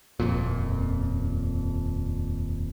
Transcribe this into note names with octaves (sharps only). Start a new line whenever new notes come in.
D#1 F2 A#2